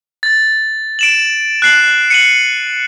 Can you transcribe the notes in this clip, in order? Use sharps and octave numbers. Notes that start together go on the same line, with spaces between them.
A6
D7 E7 F#7
F#6 C7 F#7
C#7 D#7 F#7